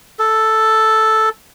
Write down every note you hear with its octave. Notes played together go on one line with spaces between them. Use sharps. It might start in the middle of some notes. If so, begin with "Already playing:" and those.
A4